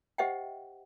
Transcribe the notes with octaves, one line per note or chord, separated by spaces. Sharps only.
G4 C5 D#5 E5 F#5 G5